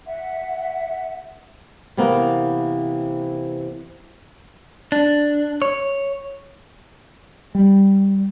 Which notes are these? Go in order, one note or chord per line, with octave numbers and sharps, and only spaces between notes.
E5 F#5
C3 E3 A#3 B3
D4
C#5
G3